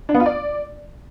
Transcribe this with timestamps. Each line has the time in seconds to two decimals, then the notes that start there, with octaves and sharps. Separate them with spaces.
0.09 D4
0.14 B3
0.20 F4
0.26 D5